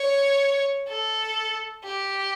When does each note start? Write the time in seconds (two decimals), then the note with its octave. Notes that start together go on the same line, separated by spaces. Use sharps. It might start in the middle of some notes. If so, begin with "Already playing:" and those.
Already playing: C#5
0.88 A4
1.84 G4